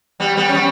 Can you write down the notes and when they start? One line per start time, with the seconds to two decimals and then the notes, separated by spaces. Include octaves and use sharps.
0.20 G3 B3
0.37 G3 B3
0.49 C#4
0.54 G3 B3